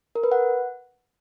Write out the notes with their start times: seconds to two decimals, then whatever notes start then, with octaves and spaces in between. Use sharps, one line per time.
0.15 A#4
0.24 B4
0.32 F#5